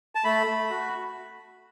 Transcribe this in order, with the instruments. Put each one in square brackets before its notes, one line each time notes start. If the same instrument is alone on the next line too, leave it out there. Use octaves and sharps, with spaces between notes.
[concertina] A5
A3 B5
A3
F#4